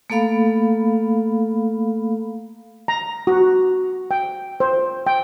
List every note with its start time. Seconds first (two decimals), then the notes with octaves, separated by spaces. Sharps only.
0.10 A3 A#3 A4 F5 B5
2.88 A#5
3.27 F#4
4.11 G5
4.60 C5
5.07 G5